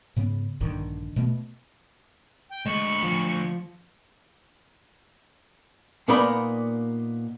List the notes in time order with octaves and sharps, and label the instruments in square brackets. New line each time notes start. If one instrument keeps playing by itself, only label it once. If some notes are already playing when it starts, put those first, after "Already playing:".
[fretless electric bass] G#2 C#3 B3
A#1 G2 D3 D#3
B2 A3 B3
[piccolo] G5
[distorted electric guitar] D2 B5 [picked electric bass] G#3 [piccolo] C#6
[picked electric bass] F3
[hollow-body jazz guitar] A#2 A#3 B3 D#4 D5 B5